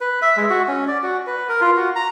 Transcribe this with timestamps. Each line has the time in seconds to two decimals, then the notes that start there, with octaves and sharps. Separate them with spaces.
0.01 B4
0.22 E5
0.37 G#3
0.50 F#4
0.68 C#4
0.88 D5
1.03 F#4
1.27 B4
1.49 A#4
1.61 F4
1.77 F#4
1.96 A#5